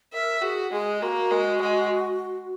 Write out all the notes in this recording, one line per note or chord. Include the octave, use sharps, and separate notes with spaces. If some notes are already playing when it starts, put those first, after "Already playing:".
A#4 E5
F#4 G#4
G#3 G#4
A#3 F#4
G#3
G#3